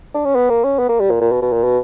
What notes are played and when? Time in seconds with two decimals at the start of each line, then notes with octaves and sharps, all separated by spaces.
0.14 D4
0.25 C#4
0.36 B3
0.50 A#3
0.64 C#4
0.79 B3
0.89 A#3
1.00 G3
1.10 A#2
1.21 A#2
1.32 B2
1.42 B2
1.53 A#2
1.64 B2